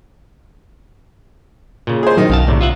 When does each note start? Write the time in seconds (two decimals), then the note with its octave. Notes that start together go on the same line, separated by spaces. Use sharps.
1.87 A#2 C#3
2.03 G#4 C5
2.17 D#3 F#3 D#4
2.30 B1 F#2 F5 A5
2.47 D2 A2 C3
2.61 F4 E5 F#5